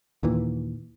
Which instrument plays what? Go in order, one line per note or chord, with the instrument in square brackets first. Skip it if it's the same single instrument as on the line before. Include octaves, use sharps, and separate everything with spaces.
[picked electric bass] D#2 A#2 E3